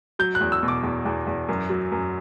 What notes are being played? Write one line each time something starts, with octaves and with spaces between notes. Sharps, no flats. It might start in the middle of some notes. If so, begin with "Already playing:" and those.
F#3 G6
F#6
E2
E6
B2
D6
E2
E2
E2
F#2
F#3
F#2